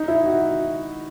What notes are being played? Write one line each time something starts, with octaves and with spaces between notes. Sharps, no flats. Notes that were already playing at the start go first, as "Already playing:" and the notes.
Already playing: D#4
E4
F#4